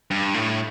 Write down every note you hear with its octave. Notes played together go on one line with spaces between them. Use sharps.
G2
A2